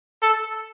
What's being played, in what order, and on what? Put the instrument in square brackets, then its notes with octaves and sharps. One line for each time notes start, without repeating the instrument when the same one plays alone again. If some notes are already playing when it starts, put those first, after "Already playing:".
[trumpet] A4